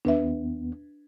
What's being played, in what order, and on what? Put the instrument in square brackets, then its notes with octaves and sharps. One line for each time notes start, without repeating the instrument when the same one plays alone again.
[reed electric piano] D#2 B3 [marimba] D4 B4 E5